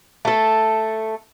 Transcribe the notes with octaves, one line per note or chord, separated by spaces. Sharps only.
A3 A4